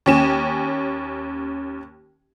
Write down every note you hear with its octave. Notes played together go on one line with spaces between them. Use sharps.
D#2 C#4 E7